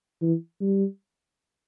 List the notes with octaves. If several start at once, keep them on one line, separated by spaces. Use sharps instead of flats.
E3
G3